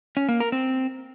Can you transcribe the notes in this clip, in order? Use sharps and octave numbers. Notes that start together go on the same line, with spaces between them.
C#4
A#3
A#4
C4